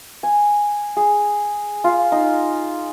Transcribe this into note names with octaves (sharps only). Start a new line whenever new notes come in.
G#5
G#4
F4
D#4